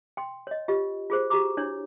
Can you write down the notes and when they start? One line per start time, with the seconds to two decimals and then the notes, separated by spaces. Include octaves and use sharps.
0.17 G5 C6
0.47 C#5 D#5
0.68 F4 G4 D#5
1.10 F4 G#4 C5
1.30 F#4 G4 A#5 D6
1.57 D4 E4 C#5